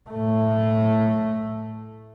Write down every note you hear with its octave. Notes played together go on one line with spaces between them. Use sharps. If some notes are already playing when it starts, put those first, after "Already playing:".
A2 A3